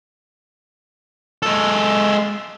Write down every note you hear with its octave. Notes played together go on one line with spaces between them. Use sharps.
G#3 A4